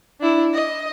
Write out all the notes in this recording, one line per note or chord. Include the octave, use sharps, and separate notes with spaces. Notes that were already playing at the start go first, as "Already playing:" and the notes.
D4 E4
D#5